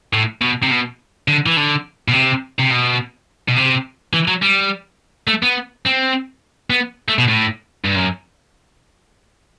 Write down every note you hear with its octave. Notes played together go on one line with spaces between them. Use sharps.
A2
B2
C3
B2
D3
E3
D3
B2
C3
C3
B2
B2
C3
E3
F#3
G3
A3
B3
C4
B3
A3
B2
A2
G2
F#2